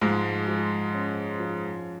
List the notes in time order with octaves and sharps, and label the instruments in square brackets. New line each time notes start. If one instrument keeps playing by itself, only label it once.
[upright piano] G#2 G#3 [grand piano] F3
[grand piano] F3
C#4
F3